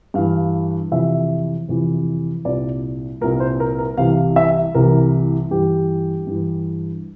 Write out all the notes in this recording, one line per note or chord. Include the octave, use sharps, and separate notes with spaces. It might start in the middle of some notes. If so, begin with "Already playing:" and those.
G2 E3 F5
F2 C3 E3 E5
F2 C3 E3
C2 A#2 D5
C2 A#2 A#4
C5
A#4
A#4
C2 C3 E3 F5
E5
C2 C3 E3 A#4
G2 E3 G4
G2 E3